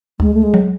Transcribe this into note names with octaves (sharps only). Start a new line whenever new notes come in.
D2 G#3
A3
G#3
F#3